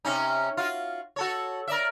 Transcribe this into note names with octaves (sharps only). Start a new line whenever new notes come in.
C3 C#4 D#4
F4 F#4
F#4 A4 C#5
A#4 D5 E5